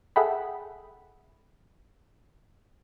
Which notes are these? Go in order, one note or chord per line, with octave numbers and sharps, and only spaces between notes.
G#4 A4 E5 F#5 G5 B5